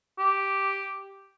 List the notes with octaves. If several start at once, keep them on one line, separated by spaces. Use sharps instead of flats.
G4